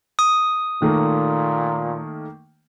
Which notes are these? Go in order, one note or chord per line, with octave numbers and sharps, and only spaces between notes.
D#6
A#2 D#3 A3 A#3